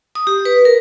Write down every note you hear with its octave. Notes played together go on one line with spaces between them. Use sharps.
D#6
G4
B4
A#4